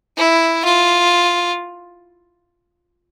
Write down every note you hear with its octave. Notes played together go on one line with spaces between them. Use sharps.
E4
F4